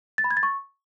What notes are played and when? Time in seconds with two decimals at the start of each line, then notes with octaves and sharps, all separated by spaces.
0.18 A6
0.24 B5
0.31 G#6
0.37 A6
0.43 C#6